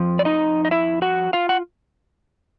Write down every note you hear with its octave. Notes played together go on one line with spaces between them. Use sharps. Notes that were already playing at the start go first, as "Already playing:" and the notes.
Already playing: F2 F3
D5
D#4 D#5
D#5
E4 E5
F#4 F#5
F4 F5
F#5